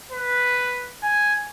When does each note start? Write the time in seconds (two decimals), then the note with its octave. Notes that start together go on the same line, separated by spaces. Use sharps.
0.12 B4
1.03 G#5